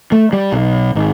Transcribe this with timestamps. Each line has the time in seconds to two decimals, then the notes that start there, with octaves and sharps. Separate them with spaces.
0.12 A3
0.33 G3
0.52 B1
0.95 G#1